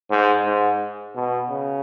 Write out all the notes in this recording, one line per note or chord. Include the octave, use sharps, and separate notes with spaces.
G#2
G#2
B2
C#3